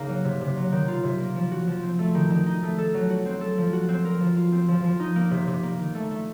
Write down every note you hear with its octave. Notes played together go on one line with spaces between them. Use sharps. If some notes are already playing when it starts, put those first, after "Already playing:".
Already playing: C#3 A#3 D#4
F#3
C3
C3
F#3
D#3
F4
C3
A#3
F3
F#4
F3
C4
A3
D#3
D#3
D#4
A3
A4
F#3
F#4
C4
A4
F3
F#4
C4
A#4
F3
F4
C4
F3
F3
D#4
A#3
C3
C3
A#3
D#3
A3
A3